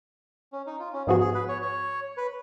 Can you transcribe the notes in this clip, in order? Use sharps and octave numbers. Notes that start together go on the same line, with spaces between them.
C#4
D#4
F4
C#4
G#2 F3 B3 F#4 G#4
G#4
B4
C#5
C#5
B4